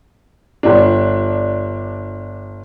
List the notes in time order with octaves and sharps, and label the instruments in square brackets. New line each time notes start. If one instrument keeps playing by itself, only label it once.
[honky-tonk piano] G1 D4